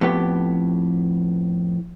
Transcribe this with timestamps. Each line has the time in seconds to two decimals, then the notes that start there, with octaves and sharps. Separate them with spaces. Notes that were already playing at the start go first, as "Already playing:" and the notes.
0.01 F2 A2 B3 G4